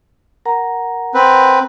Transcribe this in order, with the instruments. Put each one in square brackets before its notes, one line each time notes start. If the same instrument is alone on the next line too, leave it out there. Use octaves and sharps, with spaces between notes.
[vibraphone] A#4 F#5 A#5
[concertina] C4 B4